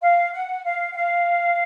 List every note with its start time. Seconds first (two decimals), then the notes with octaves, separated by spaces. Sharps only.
0.02 F5
0.33 F#5
0.65 F5
0.91 F#5
0.95 F5